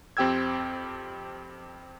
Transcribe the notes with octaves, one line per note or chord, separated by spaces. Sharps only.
F2 C4 G4 G5 E6 G#6